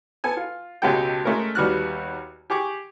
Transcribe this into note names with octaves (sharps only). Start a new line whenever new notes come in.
B3 A4 G#5
F4
C#2 B2 G#3 G4 A4 G5
G#3 A3 C#4 A#4
D#2 G3 B3 F#4 F6 F#6
G4 G#4 C#6 D6